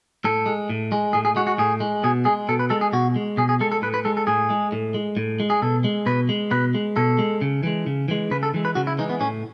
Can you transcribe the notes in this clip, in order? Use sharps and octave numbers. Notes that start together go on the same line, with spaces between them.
A2 A4
G#3
A2
G#3
A2 G#4
G#4
G#3 F#4
F#4
A2 G#4
G#3
B2 G#4
G#3 G#4
B2 A4
B4
G#3 A4
G#4
B2 F#4
G#3
B2 G#4
G#4
G#3 A4
A4
A2 B4
B4
G#3 A4
A4
A2 G#4
G#3
A2
G#3
A2
G#3
G#4
B2 A4
G#3
B2 B4
G#3
B2 B4
G#3
B2 A4
G#3
C#3
E3 G#3
C#3
E3 G#3
C#3 B4
A4
E3 G#3
B4
C#3 F#4
E4
E3 G#3 D#4
B3
A2 C#4